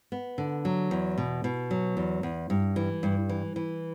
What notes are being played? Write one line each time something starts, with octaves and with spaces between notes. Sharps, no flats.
B3
D3
F#3
E2
B2
B2
F#3
E2
E2
G2
E3
G2
E3
E3